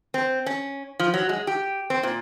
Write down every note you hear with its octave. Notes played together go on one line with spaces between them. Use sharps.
C4
C#4
F3
F#3
G#3
G4
C4
A#2